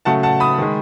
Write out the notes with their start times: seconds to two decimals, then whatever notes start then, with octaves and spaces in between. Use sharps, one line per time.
0.05 C#3 F#3 A3 F#5 A5
0.23 F#5 A5
0.40 B5 D#6
0.58 D#3 G#3